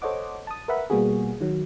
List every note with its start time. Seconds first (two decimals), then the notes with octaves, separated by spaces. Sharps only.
0.02 A4 C5 C#5 D#5 F#5 D6
0.47 A5 D#6
0.68 A#4 B4 E5 F#5 B5
0.90 B2 G3 A#3 B3 F#4 G#4
1.41 D#3 F#3